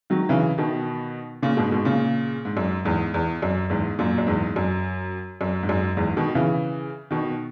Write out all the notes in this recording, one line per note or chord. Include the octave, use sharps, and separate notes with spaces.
D#3 F#3
C#3 E3
B2 D#3
A#2 C#3
G#2 B2
G#2 B2
A#2 C#3
G#2
F#2
E2 G#2
E2
F#2
E2 G#2
F#2 A#2
F#2
E2 G#2
F#2
F#2
G#2
F#2
E2 G#2
B2 D#3
C#3 E3
B2 D#3